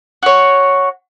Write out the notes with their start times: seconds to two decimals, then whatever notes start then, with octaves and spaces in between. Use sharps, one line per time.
0.23 F#4 C#5